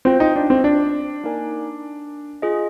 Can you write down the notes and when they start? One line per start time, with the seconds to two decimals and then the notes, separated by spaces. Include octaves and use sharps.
0.05 C4 F4 C5 G5
0.20 D#4
0.36 D4
0.50 C4
0.64 D4
1.24 A#3 D#4 A#4 D5 G#5
2.42 F4 G#4 D#5